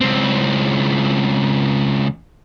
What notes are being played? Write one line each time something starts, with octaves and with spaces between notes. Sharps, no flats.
C#2 C4